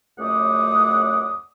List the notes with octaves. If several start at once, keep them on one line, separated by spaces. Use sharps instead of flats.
C#2 F#2 A3 D5 F#5 D#6